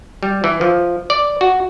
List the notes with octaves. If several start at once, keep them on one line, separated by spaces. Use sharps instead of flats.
G3
E3
F3
D5
F#4